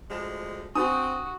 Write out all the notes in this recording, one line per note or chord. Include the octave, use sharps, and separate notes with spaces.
D2 F3 G#3
C4 D4 F#4 D#6